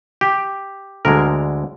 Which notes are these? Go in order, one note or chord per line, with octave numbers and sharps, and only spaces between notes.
G4
D2 D3 G#3 A#4